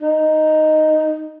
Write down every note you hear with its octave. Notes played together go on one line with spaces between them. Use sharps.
D#4